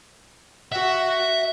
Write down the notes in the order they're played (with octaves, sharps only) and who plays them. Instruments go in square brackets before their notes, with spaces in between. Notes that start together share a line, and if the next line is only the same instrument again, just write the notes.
[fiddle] F#4 [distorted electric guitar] E5